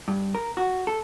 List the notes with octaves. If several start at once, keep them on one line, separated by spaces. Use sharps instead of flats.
G2
A#4
F#4
A4